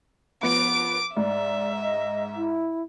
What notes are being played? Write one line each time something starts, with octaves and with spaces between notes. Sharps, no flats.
F3 B3 D6 D7
G#2 D5 E5
D#5
E4